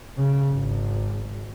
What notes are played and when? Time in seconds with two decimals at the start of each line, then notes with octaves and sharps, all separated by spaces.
0.18 C#3
0.50 G#1